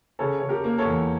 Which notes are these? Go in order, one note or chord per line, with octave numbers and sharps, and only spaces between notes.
C#3 A4 C#5
C#3 C#5
G4 A#4
A#3
A4 C#5
E2